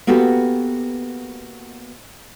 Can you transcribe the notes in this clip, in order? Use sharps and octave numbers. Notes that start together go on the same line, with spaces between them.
A#3 B3 F#4 G4 A4 B4